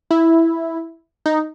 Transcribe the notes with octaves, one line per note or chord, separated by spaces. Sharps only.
E4
D#4